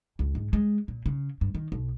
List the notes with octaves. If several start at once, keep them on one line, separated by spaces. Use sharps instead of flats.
C#2
G#2
G#3
A#2
C#3
G2
D#3
B1